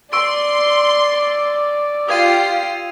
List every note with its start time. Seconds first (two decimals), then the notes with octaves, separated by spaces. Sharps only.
0.13 D5 C6 C#6 E6 D7
2.09 F4 G4 D#6 G#6 C7 D#7